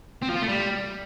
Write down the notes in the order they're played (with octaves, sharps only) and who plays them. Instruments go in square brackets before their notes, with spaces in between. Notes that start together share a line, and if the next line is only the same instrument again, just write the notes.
[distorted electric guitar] C4
F3
F4
A3
G3